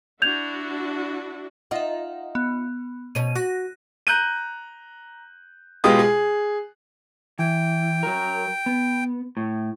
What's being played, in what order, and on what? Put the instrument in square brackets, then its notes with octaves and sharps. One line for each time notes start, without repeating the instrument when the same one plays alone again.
[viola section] D4 E4 F#4 [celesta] G6 G#6 F7
[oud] D#4 F4 D#5 [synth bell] E5 F#5
[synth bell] B3
[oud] B2 C#4 [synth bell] D#7
[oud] F#4 [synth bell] F#6 A#6
[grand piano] A#5 F#6 G6 D#7
B2 G#3 F4 G4 D#6
G#4
[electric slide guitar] E3 [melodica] G5
[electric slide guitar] F#3 A#4
B3
A2